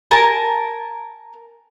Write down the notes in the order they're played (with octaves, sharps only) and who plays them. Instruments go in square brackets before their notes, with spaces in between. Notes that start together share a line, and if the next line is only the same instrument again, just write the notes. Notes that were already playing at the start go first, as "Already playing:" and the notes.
[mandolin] A#4 G#5 A5